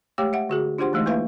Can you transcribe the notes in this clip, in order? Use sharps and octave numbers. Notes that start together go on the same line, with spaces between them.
G#3 A3 G4 C#5 G5 D6
E5 F#5
D3 F#4 G#4
D4 F4 G4 C5 F#5 C6
E3 G#3 A3 D#4 D#5
A#3 E4 B4 E5 F5